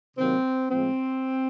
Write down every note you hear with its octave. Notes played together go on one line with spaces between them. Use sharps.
C3 D#3 F#3 A#3 C4
A2 F3 G#3 C4